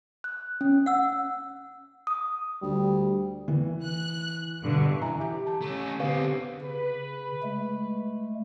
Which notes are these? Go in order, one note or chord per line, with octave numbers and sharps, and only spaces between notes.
F#6
C#4
F#5 E6
D#6
D2 G3
E3
F#6
G2 B2 D3
E3 E5 G#5 A#5
G4
A5
A3 C#4
D3 B3 C4 G4 F5
C#3 B4
G#3 A3